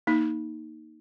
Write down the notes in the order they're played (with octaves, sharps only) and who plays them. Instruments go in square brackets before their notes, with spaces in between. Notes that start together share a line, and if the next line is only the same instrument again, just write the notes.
[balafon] A#3 D#4